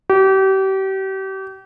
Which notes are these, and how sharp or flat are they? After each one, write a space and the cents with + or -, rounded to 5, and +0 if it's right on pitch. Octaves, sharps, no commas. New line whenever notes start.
G4 -35